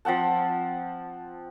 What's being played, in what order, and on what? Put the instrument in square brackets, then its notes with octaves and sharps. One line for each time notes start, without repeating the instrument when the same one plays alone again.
[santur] F3 C4 F#5 A5